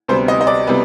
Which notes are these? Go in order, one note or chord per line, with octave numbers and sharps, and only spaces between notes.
D2 C3 G3 B3 C5
D#5
D#5
D5
C3 G3 B3